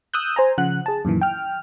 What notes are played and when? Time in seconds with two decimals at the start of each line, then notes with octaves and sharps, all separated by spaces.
0.14 D#6 E6 F#6 G6
0.36 C5 G#5 A#5
0.58 C#3 F3 F#5 F#6
0.86 G#4 A5
1.05 F#2 A#2 D#3 E3
1.21 G5 F6